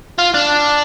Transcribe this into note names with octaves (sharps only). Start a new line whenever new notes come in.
F4
D4